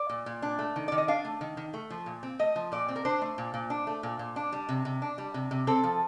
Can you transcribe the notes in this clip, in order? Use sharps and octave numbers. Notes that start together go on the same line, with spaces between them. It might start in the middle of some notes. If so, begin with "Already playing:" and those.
Already playing: D5
A#2
A#2
D4
A3
D#3
D#3 D5
D#5
D4 F5
A3
D#3
D#3
A3
F3
A#2
C4
A3 D#5
F3
A#2 D5
C4
A#4
D4 C5
A3
A#2
A#2
D4
A3
A#2
A#2
D4
G3
C3
C3
D4
G3
C3
C3
C4 A4
F3